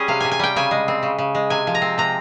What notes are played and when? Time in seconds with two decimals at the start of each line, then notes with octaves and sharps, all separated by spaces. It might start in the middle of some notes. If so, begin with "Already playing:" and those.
Already playing: G3 C#4 G#4
0.08 C3 F5
0.20 C3 G#5
0.31 G#5
0.39 G3 G5
0.56 C#3 G#5
0.71 G#3
0.88 C4
1.03 C#3
1.18 C#3
1.35 G#3
1.50 C3 G#5
1.67 F3
1.75 A#5
1.82 C4
1.98 C3 A#5